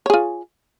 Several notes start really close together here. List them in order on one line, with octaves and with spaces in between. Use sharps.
C#5 G#4 F4